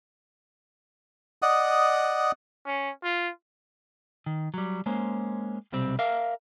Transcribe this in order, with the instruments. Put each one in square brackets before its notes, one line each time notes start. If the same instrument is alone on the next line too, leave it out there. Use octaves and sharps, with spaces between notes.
[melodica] D5 D#5 F#5 D#6
[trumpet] C#4
F4
[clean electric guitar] D#3
F#3 G3
G#3 A#3 C#4 C5
B1 C3 G3 C4
A#4 E5 F5